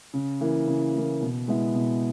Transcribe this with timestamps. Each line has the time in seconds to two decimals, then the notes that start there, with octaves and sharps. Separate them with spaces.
0.14 C#3
0.41 E3 A#3
0.67 C#3
0.95 E3 A#3
1.21 B2
1.48 G#3 B3 E4
1.75 B2